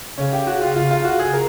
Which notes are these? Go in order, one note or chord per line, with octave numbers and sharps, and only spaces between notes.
C#3 C#4
G4
F#4
F4
C#3 F4
F4
F#4
G#4
A#4